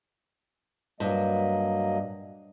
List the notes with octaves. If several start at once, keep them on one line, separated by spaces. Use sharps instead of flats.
G2 F#3 A#3 D#5